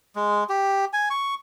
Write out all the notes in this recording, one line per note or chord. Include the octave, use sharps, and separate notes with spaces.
G#3
G4
G#5
C#6